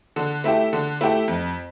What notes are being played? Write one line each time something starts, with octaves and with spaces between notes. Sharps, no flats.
D3
A3 E4 G4
D3
A3 E4 G4
F2